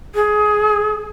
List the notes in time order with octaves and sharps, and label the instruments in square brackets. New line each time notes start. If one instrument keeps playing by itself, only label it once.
[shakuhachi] G#4